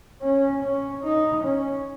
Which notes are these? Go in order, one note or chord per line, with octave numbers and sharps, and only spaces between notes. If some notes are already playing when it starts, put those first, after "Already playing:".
C#4
C#4
D#4
C#4